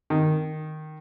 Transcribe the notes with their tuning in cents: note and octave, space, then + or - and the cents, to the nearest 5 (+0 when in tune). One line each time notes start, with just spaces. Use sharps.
D#3 -5